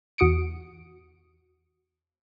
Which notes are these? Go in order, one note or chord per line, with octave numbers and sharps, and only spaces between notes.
E2 F#4 D#6 C#7 D7